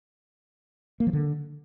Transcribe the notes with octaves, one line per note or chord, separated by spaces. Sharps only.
A#3
F3
D3